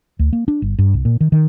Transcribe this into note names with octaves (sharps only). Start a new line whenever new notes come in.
D2
A#3
D4
G1
G2
C2
A#2
D#3
D#3